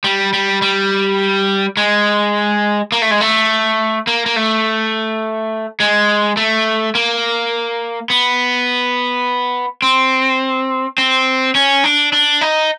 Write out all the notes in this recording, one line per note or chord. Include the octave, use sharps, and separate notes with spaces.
G3
G3
G3
G#3
A#3
A3
G#3
A3
A#3
A#3
A3
G#3
A3
A#3
B3
C4
C4
C#4
D4
D4
D#4